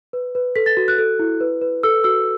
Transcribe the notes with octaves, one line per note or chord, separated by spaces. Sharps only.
B4
B4
A4 B6
A6
F#4
F#6
A4
E4
B4
B4
A4 E6
F#4 E6